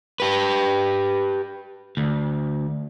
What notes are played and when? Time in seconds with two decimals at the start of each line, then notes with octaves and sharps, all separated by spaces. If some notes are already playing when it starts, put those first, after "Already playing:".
0.20 G4 B4
1.97 D2